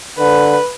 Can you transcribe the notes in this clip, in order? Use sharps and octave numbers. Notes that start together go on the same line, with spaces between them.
D3 B4